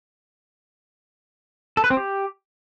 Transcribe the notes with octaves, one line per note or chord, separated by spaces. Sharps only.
A4
B4
C4
G4